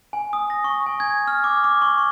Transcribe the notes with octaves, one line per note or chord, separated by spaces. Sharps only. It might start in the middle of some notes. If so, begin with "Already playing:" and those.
G#5
D#6
A#6
C#6
G#5
G#6
F6
D6
D6
C#6
C#6